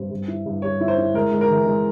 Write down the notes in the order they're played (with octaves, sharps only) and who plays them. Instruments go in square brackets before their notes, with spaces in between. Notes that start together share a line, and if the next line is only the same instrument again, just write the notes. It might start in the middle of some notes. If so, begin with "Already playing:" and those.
Already playing: [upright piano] G2 G3 C4
G2
E4
G2
[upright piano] G3 [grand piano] C#5
[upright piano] E4
[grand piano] C5
[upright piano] E4
[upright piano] G#3 [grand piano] A#4
[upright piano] G#3
[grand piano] A#4
[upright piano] E3
G#3